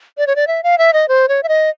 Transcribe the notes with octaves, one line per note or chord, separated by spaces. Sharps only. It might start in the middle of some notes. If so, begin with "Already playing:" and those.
D5
C#5
D5
E5
F5
E5
D#5
C5
C#5
E5
D#5